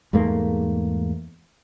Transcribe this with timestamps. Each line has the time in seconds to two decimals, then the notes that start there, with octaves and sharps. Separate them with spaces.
0.13 E2 G#2 A3 A#3